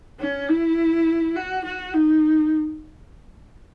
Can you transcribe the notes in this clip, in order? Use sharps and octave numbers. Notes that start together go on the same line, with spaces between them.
C#4
E4
F#4
F#4
D#4